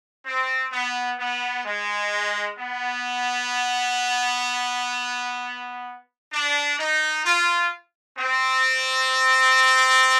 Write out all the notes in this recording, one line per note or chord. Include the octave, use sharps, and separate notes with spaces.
C4
B3
B3
G#3
B3
D4
D#4
F4
C4